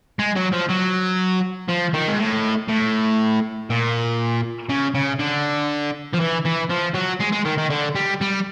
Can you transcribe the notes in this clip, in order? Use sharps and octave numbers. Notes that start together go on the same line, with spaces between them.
G#3
F#3
F3
F#3
F3
D#3
G#2
A2
A2
A#2
C#3
C#3
D3
F3
E3
E3
F3
F#3
G#3
G#3
D#3
D#3
D3
G3
G3